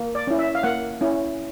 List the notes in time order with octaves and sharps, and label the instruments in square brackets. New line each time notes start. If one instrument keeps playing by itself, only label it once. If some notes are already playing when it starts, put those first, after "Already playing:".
Already playing: [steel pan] A#3
D5
C#4 E4
E5
F5
A#3 F#5
C#4 E4